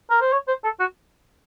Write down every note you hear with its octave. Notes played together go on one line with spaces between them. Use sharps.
A#4
C5
C#5
C5
A4
F#4